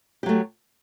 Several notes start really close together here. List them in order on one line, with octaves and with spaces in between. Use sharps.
G4 F#3 A3